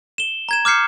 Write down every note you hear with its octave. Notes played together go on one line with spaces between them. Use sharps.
E7 G7
A#5 G#6 E7
D6 F6 G6 C7 C#7